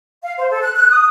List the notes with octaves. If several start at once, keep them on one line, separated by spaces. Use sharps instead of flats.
F5
C5
A4
F#6
F#6
D#6